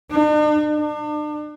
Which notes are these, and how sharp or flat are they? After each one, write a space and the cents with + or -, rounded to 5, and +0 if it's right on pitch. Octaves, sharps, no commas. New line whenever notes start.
D4 +45
D4 +35